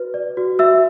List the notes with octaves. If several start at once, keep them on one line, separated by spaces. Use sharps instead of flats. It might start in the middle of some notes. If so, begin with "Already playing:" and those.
Already playing: F#4 B4
D5
F#4
F#4 E5 E6